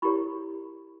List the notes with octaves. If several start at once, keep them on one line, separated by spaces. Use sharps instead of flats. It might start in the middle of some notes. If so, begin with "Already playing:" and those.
E4 G4 A#4 C#5 B5 C#6